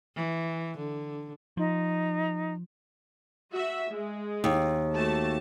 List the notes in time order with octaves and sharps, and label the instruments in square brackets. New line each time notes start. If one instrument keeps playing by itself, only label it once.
[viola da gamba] E3
D3
[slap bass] F3 [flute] D#4
[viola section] F#4 E5
G#3
[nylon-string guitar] D#2
[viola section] A3 F#4 A5